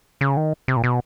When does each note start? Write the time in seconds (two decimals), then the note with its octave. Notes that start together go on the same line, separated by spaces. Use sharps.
0.21 C#3
0.37 D#3
0.68 C3
0.77 A#2
0.84 B2